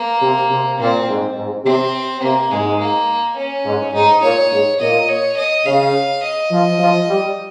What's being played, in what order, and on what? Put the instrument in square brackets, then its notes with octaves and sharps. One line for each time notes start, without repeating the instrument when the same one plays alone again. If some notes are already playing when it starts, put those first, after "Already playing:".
Already playing: [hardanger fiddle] A#3
[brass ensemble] C3
C3
[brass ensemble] A#2 [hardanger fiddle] C4
[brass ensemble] G#2
G#2
[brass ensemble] C3 [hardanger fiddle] C4
[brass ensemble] C3 [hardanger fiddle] A#3
[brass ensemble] G#2 [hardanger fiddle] G#3
[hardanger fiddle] A#3
C#4
[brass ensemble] G#2
[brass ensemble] G#2 [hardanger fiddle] D#4
[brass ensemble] A#2 [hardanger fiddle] C#5
[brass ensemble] G#2
[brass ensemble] A#2 [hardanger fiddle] D#5
[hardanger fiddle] C#5
D#5
[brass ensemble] C#3 [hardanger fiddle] F5
[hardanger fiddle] D#5
[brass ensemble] F3
F3
G3